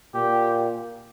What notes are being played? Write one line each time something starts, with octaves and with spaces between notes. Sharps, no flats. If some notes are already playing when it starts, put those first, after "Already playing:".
A#2 G4